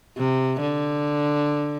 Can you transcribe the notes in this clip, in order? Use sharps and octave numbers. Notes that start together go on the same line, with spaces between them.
C3
D3